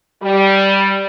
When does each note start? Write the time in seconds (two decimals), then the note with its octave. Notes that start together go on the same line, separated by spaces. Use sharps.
0.23 G3